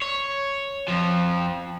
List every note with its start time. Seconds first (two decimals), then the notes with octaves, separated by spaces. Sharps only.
0.02 C#5
0.88 F2 F3